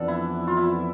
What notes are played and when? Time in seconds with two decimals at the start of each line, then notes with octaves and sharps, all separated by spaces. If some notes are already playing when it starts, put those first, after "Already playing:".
Already playing: F2 E3 B3 D4 A4
0.08 E4
0.47 F4
0.57 E4